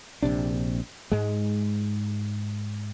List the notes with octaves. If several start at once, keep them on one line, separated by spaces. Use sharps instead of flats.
A#1 C3 D4
G#2 G#3